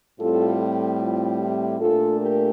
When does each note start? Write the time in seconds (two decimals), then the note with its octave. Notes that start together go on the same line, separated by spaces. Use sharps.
0.20 A2 G3 C4 F4 A4
1.01 F4
1.40 E4 G4
1.80 A#2 A3 D4 F4 A4
2.21 G4 A#4